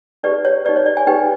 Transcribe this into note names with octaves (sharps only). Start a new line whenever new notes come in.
D#4 G4 B4 D5
C#5
D#4 G4 B4 D5
C#5
D5
G#5
D#4 G4 B4 G5